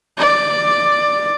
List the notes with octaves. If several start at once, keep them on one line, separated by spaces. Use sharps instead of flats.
D5